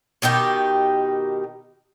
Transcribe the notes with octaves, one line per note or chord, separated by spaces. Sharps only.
B2 D#3 D#4 G4